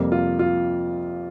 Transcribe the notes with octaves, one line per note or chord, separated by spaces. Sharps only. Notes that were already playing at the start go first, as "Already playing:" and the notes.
Already playing: F2 C3 G3 A#3
F4
F4